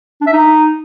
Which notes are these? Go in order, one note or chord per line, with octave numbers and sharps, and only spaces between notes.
D4
E5
D#4